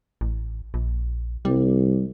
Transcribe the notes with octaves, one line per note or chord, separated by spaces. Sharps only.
A1
A#1
C2 G3